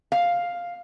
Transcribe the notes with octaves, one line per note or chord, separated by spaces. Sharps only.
F5